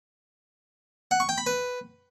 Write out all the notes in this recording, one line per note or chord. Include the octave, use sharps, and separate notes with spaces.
F#5
C#6
G5
B5
B4